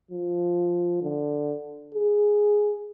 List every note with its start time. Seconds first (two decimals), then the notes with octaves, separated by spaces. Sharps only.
0.11 F3
1.02 D3
1.94 G#4